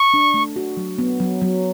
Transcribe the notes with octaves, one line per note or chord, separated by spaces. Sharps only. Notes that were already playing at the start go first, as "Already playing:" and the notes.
Already playing: C#6
D4
A3
F#4
F#3
B3
F#3
F#3